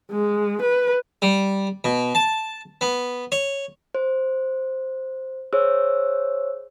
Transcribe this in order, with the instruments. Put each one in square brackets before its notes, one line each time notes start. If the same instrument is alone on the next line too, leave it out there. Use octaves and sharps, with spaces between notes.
[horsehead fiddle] G#3
B4
[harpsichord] G3
B2
A5
B3
C#5
[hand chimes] C5
G#4 C5 C#5 E6